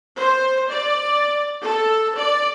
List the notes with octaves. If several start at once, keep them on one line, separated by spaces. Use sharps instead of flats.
C5
D5
A4
D5